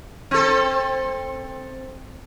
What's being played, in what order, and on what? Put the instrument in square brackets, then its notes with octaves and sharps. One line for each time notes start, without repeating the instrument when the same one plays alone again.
[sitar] C4 A4